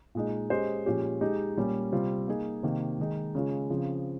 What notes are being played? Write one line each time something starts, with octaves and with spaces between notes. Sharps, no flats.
A#2 G#3 D#4
G#3 C#4 G4 C5 D#5
A#2 F3 G#3 C#4 G4
G#3 D#4 G4
A#2 G3 A#3 C#4
C3 G3 C4 F4
A#3 D#4 G#4
C3 D#3 A#3
D#3 G#3 D#4
C#3 G#3 C#4 F4
C#3 F3 C4